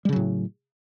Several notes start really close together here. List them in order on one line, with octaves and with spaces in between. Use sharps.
G3 C#3 F#3 A2